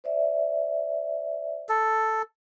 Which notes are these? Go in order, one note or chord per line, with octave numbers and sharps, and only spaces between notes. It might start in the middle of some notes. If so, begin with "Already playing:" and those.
C5 D5 E5
A4